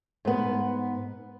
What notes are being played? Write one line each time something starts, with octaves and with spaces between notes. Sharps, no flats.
G#2 B3